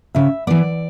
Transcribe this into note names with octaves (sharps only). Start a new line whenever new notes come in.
C#3 E5
E3 B3 D5